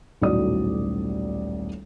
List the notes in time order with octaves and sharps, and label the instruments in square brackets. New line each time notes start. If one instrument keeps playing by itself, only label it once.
[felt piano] D#1 B1 A2 F#4 D5 D#6